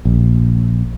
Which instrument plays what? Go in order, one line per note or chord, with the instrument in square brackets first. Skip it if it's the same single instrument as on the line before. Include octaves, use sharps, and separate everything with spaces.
[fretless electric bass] A#1